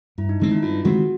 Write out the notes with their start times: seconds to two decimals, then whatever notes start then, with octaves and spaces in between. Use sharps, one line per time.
0.18 G2 E4
0.29 D#4
0.40 D#3 G#3 C4 D#4
0.51 E4
0.62 G2 F4
0.85 D#3 G#3 C4 F#4